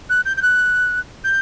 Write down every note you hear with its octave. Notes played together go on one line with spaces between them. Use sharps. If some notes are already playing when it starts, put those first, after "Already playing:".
F#6
G6
G6
F#6
G6